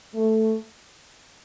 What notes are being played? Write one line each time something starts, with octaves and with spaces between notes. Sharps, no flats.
A3